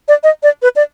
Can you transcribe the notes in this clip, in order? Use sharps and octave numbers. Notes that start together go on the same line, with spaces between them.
D5
D#5
D5
B4
D5